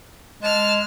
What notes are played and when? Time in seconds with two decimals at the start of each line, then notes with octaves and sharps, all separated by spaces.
0.42 G#3 A5 F6